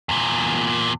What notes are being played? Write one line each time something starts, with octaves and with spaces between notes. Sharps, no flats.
E2 A#2